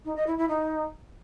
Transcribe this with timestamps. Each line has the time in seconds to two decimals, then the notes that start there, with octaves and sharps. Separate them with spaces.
0.05 D#4
0.16 D#5
0.27 E4
0.38 E4
0.49 D#4